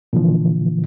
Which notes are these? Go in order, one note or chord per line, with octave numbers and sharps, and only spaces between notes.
A#2 D3 E3 F3